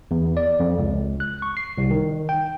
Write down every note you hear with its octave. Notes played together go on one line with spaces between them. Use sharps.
E2
D5
F2
C#2
F#6
C#6
C7
C2
D#3
G5